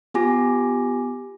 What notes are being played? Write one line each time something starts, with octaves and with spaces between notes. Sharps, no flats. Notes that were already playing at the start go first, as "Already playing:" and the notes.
B3 F4 G4 G#5 D6 A#6